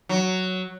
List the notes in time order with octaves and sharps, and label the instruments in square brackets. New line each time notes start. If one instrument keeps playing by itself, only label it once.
[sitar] F#3